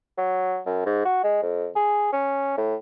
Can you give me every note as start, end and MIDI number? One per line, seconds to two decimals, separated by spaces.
0.18 0.60 54
0.66 0.82 42
0.86 1.05 44
1.05 1.22 66
1.23 1.42 56
1.42 1.68 41
1.76 2.10 68
2.13 2.56 61
2.57 2.75 45